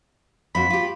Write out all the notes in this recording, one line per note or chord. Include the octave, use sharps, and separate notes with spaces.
F2 F#4 B5
F4 G4